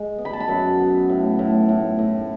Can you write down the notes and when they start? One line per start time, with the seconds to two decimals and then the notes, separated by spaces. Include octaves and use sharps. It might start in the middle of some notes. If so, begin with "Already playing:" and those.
Already playing: G#3
0.18 B3
0.25 B5
0.33 A5
0.40 B5
0.48 F#2
0.79 B3
1.09 A2
1.39 A2
1.69 A2
1.99 A2